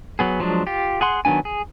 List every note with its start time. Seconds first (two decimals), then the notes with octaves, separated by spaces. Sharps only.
0.19 F#3 B3 G#4
0.40 F3 F#3 G#3 D4
0.67 F4 G4
1.01 G#4 F#5 C6
1.25 D#3 F#3 B3 D4 G#5
1.45 G#4